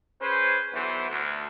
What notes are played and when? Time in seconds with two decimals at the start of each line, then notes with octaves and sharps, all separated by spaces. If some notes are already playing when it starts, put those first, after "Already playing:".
0.22 C#4 G#4 B4 C5
0.73 B1 D3 E3 B3 C5
1.10 D2